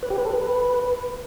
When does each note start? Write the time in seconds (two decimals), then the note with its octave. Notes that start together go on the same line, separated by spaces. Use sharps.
0.03 B4
0.10 G4
0.18 B4
0.26 A4
0.33 B4